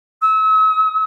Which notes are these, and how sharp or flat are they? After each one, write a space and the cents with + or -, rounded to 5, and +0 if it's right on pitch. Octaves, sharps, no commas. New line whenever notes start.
E6 -40